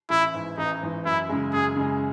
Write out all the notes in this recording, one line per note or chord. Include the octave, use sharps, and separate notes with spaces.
A1 E4
G#2 E3
A1 D#4
G#2 E3
F#2 E4
C#3 G#3
F#2 G#4
C#3 G#3